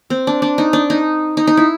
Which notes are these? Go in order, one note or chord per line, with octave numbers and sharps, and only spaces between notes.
C4
D4
D4
D#4
D4
D#4
D#4
D#4
E4